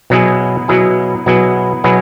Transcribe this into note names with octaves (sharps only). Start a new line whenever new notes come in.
B2 F#3 B3 E4 G#4
B2 F#3 B3 E4 G#4
B2 F#3 B3 E4 G#4
B2 F#3 B3 E4 G#4